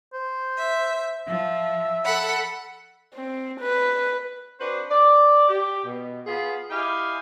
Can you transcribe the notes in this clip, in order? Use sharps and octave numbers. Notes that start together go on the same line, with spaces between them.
C5
E5
F3 E5
A4 F#5 B5
C4
B4
C4 D4 F#4 B4 C5
D5
G4
B2
B3 F4 G#4
E4 G4 D#5 F5 G5 G#5